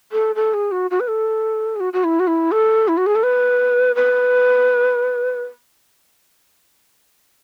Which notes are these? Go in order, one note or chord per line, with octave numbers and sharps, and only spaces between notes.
A4
A4
G#4
F#4
F#4
B4
A4
G#4
F#4
F#4
E4
F#4
E4
A4
E4
F#4
G#4
A4
B4
B4